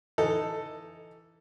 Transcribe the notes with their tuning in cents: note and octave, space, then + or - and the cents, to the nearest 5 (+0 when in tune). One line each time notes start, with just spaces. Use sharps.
E3 +10 D#4 +0 A4 +5